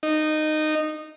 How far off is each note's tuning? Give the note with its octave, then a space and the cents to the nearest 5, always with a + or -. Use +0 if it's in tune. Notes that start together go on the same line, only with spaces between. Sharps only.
D#4 -15